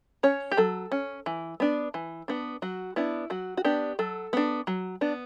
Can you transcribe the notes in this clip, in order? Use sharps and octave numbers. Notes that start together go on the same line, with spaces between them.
C#4 C#5
G4
F#3 A4
C#4
E3
B3 D4
E3
B3 D4
F#3 F#4
B3 D4 E4
F#3 F#4
F#4
B3 D4 G4
F#3 A4
B3 D4
F#3
B3 D4